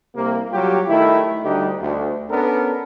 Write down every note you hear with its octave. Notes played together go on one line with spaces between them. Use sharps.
C2 C3 A#3
F#3 G3 F4 G4
D#3 A3 E4
D2 G3 D4 D#4 G4
D2
B3 C#4 D4 A4 A#4